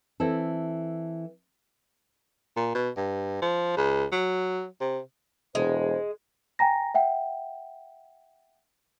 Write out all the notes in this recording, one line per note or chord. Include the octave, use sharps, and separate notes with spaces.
E3 C4 E4 A4
A#2
B2
G2
F3
C#2
F#3
C3
E1 G#3 C5
G5 G#5 A#5 A#6
E5 F#5 G5